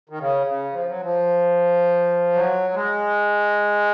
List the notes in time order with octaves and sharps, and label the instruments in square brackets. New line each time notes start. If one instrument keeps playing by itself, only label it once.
[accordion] D#3
C#3
C#3
F3
F#3
F3
F#3
G#3